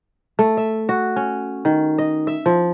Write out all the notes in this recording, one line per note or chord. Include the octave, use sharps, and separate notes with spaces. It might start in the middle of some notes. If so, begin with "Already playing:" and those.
A3
E5
F#4
C#4
D#3
D#5
E5
F3